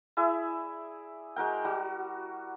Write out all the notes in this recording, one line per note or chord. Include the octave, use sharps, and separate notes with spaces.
E4 G#4 D5 E5
G#3 F#4 A#4 G5
G3 F#4